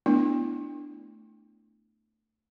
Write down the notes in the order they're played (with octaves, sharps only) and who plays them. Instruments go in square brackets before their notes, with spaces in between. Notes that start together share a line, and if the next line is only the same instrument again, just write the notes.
[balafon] A3 B3 D4 E4